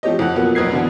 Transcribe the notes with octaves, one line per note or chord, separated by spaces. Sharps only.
F3 A3 G4 C#5 D#5
F2 A4 F#5 F#6
B2 F3 F#3 A#3 B3
F1 B1 D#6 G#6 C7
B2 D3 E3 B3